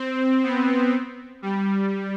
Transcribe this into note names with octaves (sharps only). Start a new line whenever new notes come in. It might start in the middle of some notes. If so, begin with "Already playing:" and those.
Already playing: C4
B3
G3